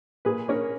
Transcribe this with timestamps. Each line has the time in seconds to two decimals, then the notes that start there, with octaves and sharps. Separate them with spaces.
0.25 A#2 G#4 B4
0.48 A#3 C#4 A#4 C#5